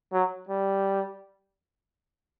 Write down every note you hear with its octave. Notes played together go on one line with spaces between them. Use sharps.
F#3
G3